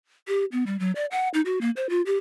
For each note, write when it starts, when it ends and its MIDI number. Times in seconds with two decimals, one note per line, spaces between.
0.28 0.45 67
0.52 0.64 59
0.66 0.79 55
0.80 0.92 54
0.95 1.06 74
1.11 1.28 78
1.34 1.41 63
1.46 1.61 66
1.61 1.70 58
1.76 1.87 72
1.90 2.02 65
2.06 2.18 67